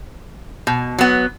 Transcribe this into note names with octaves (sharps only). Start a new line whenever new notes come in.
B2
F#3 B3